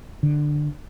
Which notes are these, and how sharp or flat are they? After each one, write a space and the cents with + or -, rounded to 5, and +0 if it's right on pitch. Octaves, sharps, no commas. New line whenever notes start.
D3 +15